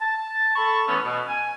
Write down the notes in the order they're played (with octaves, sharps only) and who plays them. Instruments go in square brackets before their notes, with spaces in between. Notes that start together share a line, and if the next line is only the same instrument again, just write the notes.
[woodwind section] A5
A4 A5 B5 C#6
E3 A3 B3 C#4
B2
G#5